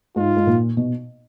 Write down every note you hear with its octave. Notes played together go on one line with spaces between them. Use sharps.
G#2 F4
G#2
A#2
B2